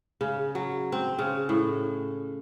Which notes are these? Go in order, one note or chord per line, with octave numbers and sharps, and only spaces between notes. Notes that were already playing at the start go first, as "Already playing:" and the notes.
C#3
F#3
C4
C#3
A2